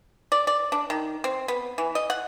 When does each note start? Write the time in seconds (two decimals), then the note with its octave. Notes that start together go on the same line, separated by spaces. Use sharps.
0.32 D5
0.47 D5
0.72 D4
0.90 D#3
1.24 C4
1.48 B3
1.78 E3
1.95 D#5
2.10 F#5